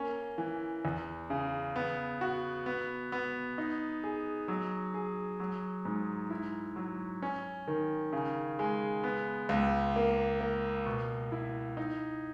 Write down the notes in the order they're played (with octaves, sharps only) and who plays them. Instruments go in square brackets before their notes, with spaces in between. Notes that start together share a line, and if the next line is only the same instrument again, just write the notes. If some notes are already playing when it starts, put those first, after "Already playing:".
Already playing: [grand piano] A#3 C#4
E3
E2
C#3
B3
F#4
B3
B3
D#4
G#4
F#3
G#4
F#3
G#2
E4
F#3
C#4
D#3
C#3
G#3
B3
C#2
A#3
A#3
B2
E4
D#4